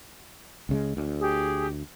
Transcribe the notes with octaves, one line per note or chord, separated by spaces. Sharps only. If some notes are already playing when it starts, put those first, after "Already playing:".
C#2 C#3 G#3
D2
G4 G#4